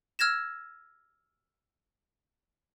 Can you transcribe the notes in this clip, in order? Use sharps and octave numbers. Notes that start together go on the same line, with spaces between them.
E6 F6 G#6 A#6 E7